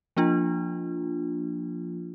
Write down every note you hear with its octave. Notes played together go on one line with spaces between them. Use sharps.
F3 A#3 D4 F4